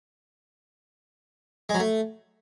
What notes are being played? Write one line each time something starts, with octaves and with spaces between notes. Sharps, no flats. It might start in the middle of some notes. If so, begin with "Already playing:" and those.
G#3
F#3
A3